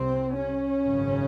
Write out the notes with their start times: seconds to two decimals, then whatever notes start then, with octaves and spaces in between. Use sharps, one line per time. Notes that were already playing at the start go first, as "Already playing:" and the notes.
Already playing: C2 C3 C4
0.38 C#4
0.85 G#1 F#2 C#3